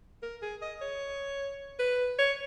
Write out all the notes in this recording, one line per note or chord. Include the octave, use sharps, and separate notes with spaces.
A#4
G#4
D#5
C#5
B4
C#5